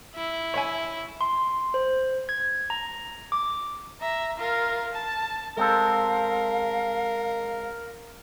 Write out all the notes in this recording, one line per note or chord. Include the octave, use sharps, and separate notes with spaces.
E4
C#5 E5 G#5
C6
C5
G#6
A#5
D6
E5 A#5
F4 A#4
A5
G#3 C4 A4 A#4 F5